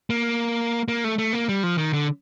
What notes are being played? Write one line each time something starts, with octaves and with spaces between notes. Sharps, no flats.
A#3
A#3
A3
A3
A#3
G3
F3
D#3
D3